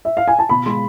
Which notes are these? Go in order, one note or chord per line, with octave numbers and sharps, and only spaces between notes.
E5
F5
G#5
A5
B2 B5
G#3 C6